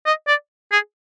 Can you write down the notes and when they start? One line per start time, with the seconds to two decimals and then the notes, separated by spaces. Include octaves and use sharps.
0.06 D#5
0.28 D5
0.72 G#4